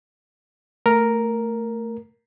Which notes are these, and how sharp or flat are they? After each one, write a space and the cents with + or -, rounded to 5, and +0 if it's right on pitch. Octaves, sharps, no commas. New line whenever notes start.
A3 +20 A#4 +0